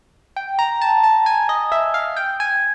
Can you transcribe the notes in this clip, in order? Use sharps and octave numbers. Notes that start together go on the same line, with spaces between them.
G5
A#5
A5
A5
G#5
D#5
E5
F5
G5
G#5